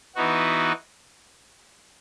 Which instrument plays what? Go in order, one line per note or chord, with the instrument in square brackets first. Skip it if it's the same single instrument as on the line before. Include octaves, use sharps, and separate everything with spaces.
[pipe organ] E3 B3 D#4 F#4